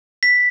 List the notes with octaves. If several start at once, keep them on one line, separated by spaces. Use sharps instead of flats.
B6